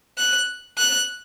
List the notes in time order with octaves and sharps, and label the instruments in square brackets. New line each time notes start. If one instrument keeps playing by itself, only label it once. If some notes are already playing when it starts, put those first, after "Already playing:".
[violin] F#6
F#6